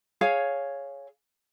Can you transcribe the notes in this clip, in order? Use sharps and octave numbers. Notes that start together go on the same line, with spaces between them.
G#4 C#5 F5